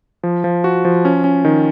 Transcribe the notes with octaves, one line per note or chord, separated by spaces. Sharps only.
F3
F3
F#4
F3
C#4
C#4
D#3